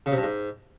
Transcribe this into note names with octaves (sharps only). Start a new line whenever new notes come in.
C#3
C3
G2
G#2